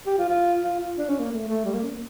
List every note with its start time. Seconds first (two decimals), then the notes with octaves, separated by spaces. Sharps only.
0.06 G4
0.18 F4
0.29 F4
0.63 F4
0.80 F4
0.97 D4
1.09 C#4
1.19 A#3
1.32 A3
1.48 A3
1.65 G3
1.73 A#3
1.83 C#4
1.90 A#3